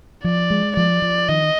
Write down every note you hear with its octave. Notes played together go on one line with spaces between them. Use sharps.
F3 D5
G#3
F3 D5
F3
D#3 D#5